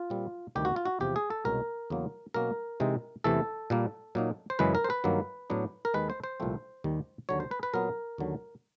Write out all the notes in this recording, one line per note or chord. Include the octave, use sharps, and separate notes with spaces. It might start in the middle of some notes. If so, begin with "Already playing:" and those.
Already playing: F4
A#2 G3 C4
D2 C3 D#3 G3 G4
F#4
F4
F#4
E2 C3 F3 G4
G#4
A4
C2 B2 G#3 C#4 A#4
E2 C#3 F#3 A#3
B2 F#3 A#3 C#4 A#4
C3 E3 G#3 C4 D#4
E2 C3 E3 A3 A4
A#2 G3 A#3
A#2 F#3 A#3 D#4
C5
F#2 C#3 E3 G#3 B4
A#4
C5
B4
G2 D#3 F#3 A#3
A2 F#3 B3 D4
A#4
D#2 D#3 G#3 B4
C5
C5
C2 A#2 F3 A3 C4
D#2 D#3 G3
D#2 D3 F#3 C#5
C5
B4
B4
A#2 F#3 B3 A#4
D#2 D3 F#3